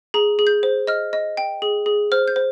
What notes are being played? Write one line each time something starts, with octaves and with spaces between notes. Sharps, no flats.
G#4 A#5
G#4
G6
C5
D#5 F6
D#5
G5
G#4
G#4
C5 F6
G6
C5